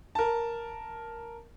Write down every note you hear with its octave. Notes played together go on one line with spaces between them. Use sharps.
A#4 A5